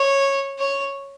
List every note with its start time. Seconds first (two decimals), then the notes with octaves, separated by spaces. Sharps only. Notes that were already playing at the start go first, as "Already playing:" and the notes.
Already playing: C#5
0.59 C#5